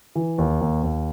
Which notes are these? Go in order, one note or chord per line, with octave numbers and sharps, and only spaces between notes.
E3
D#2
D#2
D#2